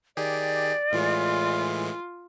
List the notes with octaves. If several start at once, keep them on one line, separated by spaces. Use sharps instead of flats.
D#3 G4 G#4 D5
A2 E3 G#3 F4